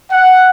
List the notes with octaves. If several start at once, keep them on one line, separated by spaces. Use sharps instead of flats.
F#5